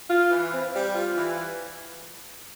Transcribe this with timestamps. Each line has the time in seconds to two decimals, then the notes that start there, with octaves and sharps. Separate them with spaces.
0.10 F4
0.31 E3
0.53 C4
0.74 G3
0.94 F4
1.16 E3